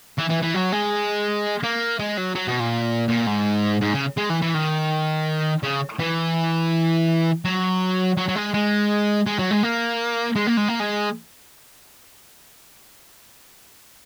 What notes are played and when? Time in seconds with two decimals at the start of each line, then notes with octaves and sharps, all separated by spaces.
0.18 E3
0.29 E3
0.42 E3
0.54 F#3
0.72 G#3
1.63 A#3
1.99 G#3
2.17 F#3
2.35 F#3
2.48 B2
2.60 A#2
3.08 A#2
3.27 G#2
3.81 G#2
3.93 C#3
4.17 G#3
4.29 E3
4.42 E3
4.54 D#3
5.63 C#3
5.99 E3
7.45 F#3
8.17 F#3
8.28 F#3
8.36 G#3
8.54 G#3
9.27 G#3
9.39 F#3
9.51 G#3
9.63 A#3
10.36 G#3
10.47 A#3
10.57 G#3
10.68 A#3
10.80 G#3